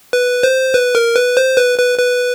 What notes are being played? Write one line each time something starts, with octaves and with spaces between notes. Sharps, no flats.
B4
C5
B4
A#4
B4
C5
B4
B4
B4